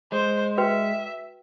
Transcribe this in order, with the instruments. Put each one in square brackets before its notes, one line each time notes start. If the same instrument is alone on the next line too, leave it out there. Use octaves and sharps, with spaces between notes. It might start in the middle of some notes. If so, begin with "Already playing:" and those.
[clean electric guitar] G#3 [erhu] C5
[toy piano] F#4 B4 G5 [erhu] E5